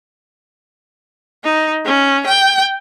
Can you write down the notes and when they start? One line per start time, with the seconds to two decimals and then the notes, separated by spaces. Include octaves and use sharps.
1.44 D#4
1.85 C#4
2.26 G5